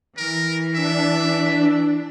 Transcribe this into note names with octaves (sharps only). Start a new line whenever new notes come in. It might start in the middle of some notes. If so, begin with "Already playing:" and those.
E3 A#4
D4 E5